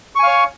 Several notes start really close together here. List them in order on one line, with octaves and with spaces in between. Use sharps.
C#6 G#5 F5 C#5